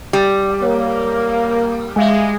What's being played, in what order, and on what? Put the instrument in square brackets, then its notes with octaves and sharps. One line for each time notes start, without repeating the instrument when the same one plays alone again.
[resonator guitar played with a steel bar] G3
[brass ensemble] A#3 [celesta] C#5
[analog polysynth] G#3 [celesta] E5 F5 G#5